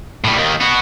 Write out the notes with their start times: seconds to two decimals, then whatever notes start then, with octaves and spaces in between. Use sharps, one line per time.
0.24 A2 G3
0.36 D#2 D#3
0.61 B3 F#4